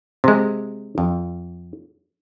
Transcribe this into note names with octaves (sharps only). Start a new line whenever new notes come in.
C3 G#3
F2